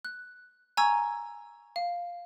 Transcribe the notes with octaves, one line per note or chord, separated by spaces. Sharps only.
F#6
G#5 A#5 C#6 E6 G#6
F5